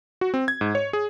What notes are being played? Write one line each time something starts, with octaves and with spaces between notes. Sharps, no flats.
F#4
C4
G#6
G#2
C#5
G#4